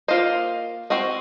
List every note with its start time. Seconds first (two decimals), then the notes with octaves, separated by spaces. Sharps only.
0.08 A#3 F4 C5 D#5
0.90 C4 F#4 C5 D#5